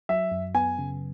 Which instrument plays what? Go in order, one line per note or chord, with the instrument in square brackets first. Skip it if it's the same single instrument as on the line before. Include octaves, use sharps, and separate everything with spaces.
[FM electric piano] F#3 [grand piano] E5
[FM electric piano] F#2
[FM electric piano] B3 [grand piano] G#5
[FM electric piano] C#3